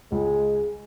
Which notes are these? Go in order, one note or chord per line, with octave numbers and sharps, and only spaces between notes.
C#2 G#3